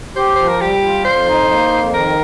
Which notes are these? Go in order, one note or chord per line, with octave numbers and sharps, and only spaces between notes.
G4 C5
F3 C5
A#4
G3 G4
F4
F2 C5
D#4
A#3
F2
D#3 A#4